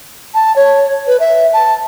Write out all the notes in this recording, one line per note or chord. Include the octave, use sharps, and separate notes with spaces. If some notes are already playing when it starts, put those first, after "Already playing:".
A5
C#5
B4
E5
A5